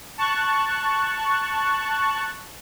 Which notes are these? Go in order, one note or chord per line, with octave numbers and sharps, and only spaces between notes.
A5 C#6 F#6